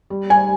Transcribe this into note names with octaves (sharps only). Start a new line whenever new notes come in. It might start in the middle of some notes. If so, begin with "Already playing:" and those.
G3
G3 G#5